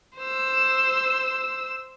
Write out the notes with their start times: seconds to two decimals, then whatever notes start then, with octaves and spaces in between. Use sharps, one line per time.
0.19 C5 E6